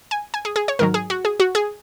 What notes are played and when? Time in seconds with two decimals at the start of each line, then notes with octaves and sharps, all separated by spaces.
0.11 G#5
0.34 G#5
0.45 G#4
0.56 G#4
0.68 C#5
0.79 G#2 D#3 F#3 A#4
0.94 G#4
1.10 F#4
1.25 G#4
1.40 F#4
1.55 G#4